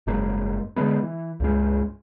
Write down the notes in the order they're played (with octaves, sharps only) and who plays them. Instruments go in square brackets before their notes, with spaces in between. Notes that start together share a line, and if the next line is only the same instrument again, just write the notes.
[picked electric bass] F#1 G#2 G#3 A#3
D3 F#3 G#3 B3
E3
C#2 G2 G#3